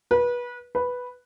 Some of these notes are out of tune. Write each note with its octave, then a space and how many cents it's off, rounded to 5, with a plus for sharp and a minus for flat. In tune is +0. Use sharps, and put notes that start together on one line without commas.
B4 -25
B4 +0